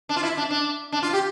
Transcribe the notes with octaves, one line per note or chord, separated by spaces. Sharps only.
D4
F4
E4
D4
D4
D4
F4
G4